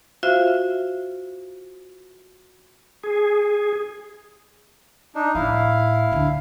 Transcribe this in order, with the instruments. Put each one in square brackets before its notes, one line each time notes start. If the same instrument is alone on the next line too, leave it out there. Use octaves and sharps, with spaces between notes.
[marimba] F4 F#4 C5 E5 F5
[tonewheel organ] G#4
[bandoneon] D4 D#4
[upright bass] A2 [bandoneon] E4 F5
[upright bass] D2 D3